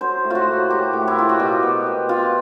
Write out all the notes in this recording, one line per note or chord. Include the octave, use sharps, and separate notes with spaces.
F#3 C5
A2
F4 F#4
A#3
F#3 G4
A2
E4
A#3 F4
F#4
B2 G4
B3
B2
B2 F4